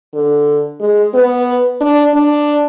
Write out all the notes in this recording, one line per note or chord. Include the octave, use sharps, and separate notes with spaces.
D3
G#3
B3
D4
D4